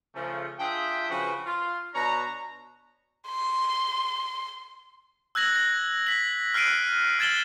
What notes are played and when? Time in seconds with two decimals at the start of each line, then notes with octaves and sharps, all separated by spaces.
0.15 C#3 F3 A3
0.60 D4 F4 G#4 E5 G5
1.10 C#3 F3 F#4 B4
1.45 F4
1.94 B2 D4 C#5 A#5
3.29 C6
5.35 E6 F#6 G#6 A#6 F#7
5.56 A#6
6.07 B6 F#7
6.54 F6 F#6 C7 D7 D#7
7.19 F6 G#6 A6 E7 F#7 G7